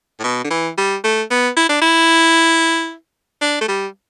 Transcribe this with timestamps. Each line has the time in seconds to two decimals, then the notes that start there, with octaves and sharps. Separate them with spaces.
0.20 A2
0.24 B2
0.45 D3
0.51 E3
0.78 G3
1.04 A3
1.30 B3
1.57 E4
1.69 D4
1.82 E4
3.42 D4
3.61 A3
3.68 G3